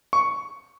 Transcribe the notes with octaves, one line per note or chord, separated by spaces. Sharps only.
C#6